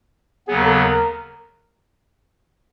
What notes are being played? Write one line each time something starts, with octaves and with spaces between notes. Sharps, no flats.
D#2 C#3 F#3 B3 G#4
A#4
A4
A#4